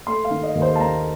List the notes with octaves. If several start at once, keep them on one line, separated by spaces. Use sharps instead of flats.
A3 C6
F5
D#3
D#5
D#2
C5
A5
D#2 A#5